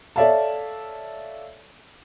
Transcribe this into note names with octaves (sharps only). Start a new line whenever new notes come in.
A4 C#5 D5 E5 F5 A5